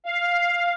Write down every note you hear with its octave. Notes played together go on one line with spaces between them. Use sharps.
F5